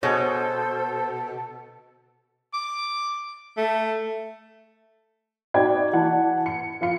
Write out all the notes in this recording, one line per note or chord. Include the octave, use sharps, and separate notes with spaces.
B2 G#4 A4 C5 C#5
D6
A3
D#4 F#4 D5 G5 G#6
E3 F#5 A5
C#7
F3 F5 C#7